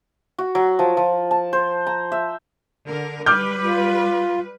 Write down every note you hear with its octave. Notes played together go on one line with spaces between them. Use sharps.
F#4
F#3
F3
F3
A5
C5
A#5
E5
D3 A#4
G3 B4 D6 F6 G6
F4